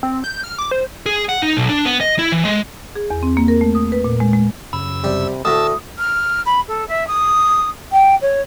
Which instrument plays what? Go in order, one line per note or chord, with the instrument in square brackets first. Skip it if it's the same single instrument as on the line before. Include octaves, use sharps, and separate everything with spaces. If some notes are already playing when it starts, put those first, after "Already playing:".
[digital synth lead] C4
G6
F6
D6
C5
[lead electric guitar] G#4
F#5
D#4
B1
D4
B3
D#5
E4
E3
G#3
[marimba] G#4
E2
C4
A#3
A#4
A3
D#6
B4
A#2
G#3
G#3
[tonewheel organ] F#2 C#3 E6 [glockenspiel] B5
[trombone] C3 [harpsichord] G3
[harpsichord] D2 A2 [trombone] A4 [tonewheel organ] A5 E6 [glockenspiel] D#6
[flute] F6
B5
A4
E5
D#6
G5
C#5